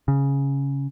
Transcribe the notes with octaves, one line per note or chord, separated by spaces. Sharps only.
C#3